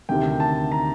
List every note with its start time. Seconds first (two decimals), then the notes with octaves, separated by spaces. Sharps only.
0.09 D2 C3 D#3 G5
0.40 A5
0.72 A#5